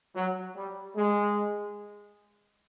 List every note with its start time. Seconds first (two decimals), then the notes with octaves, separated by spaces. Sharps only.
0.15 F#3
0.55 G3
0.95 G#3